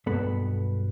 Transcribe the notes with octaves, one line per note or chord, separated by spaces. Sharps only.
B1 G2 B3 A4 B5